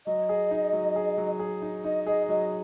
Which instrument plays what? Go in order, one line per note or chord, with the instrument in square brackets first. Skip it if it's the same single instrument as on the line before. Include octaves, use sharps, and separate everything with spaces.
[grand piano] F#3 [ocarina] D#5
[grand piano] G#4
D#4
F#3
G#4
F#3
G#4
D#4
[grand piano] D#4 [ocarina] D#5
[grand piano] G#4 [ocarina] D#5
[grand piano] F#3 [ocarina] D#5